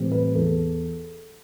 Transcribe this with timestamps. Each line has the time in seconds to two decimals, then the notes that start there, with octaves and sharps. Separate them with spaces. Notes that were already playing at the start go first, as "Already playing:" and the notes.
Already playing: A2 E3 G3 C4
0.12 B4
0.35 E2 A4